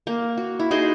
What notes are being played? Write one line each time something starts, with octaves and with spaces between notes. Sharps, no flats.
A#3
F#4
E4
D#4 F#4 G#4 C5